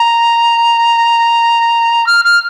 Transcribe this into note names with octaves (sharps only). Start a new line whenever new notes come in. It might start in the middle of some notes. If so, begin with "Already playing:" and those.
Already playing: A#5
F6
F6